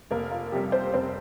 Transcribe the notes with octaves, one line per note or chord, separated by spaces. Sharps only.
F1 A#3 A#4
F4
F2 C3 G3 G4
C4 C5
F1 C4 C5